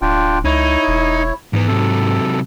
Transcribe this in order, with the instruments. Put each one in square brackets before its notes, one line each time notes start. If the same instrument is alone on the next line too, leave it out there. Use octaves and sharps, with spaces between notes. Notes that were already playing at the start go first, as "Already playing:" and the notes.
[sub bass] D1 [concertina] D4 F4 G5
[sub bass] C#2 [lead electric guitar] D#4 [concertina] E4 C#5
[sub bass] E1
[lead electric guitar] E2 B3 [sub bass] G#2
[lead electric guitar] C3 F#3 [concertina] A4